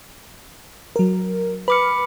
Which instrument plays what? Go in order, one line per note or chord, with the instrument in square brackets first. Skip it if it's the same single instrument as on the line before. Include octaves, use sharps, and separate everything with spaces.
[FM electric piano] F#3 A#4
[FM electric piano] B4 F6 [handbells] B5 D6 C#7